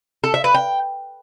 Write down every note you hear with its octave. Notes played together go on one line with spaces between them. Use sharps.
A4
E5
B4
G5